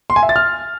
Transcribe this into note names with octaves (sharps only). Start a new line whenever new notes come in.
C6
G#5
E5
A6
F6